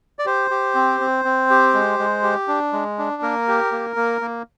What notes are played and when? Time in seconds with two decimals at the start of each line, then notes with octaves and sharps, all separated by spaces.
0.19 D5
0.26 G4 C5
0.51 G4
0.75 C4
1.01 C4
1.25 C4
1.50 G4
1.74 G#3
1.99 G#3
2.23 G4
2.48 D4
2.73 G#3
2.98 D4
3.22 A#3 A#4
3.48 G4
3.72 A#3
3.96 A#3
4.21 A#3